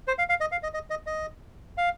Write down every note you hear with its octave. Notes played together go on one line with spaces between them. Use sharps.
C5
F5
F5
D#5
F5
D#5
D#5
D#5
D#5
F5